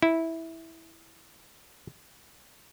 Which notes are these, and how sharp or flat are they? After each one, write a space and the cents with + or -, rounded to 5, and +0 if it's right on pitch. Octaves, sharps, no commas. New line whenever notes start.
E4 -10